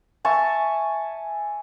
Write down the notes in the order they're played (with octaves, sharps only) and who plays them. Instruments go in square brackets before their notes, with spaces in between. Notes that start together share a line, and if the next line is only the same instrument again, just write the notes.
[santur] E5 G#5 A5 C#6